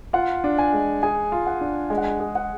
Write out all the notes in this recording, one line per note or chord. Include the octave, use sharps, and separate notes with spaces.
F4 F#5
D4
G#5
G#3
G#4 G#5
F4
F#5
D4
G#3 G#5
F#5
G#5
G#4
F#5